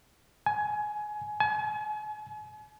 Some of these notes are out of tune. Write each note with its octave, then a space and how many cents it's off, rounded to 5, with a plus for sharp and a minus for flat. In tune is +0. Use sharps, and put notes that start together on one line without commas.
G#5 +20
G#5 +40